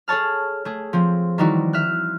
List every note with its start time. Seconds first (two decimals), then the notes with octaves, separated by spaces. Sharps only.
0.08 G#4 A4 C#5 A5 F6
0.65 A3 G#4
0.93 F3 C4
1.38 D#3 E3 G3 D#4 E4 F#4
1.73 E5 F6 F#6